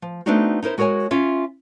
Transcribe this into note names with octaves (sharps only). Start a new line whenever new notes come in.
F3
A3 B3 C4 D4 D#4 F#4
D#4 E4 A#4 C5
G#3 F#4 A#4 C#5 G#5
C#4 F4 E5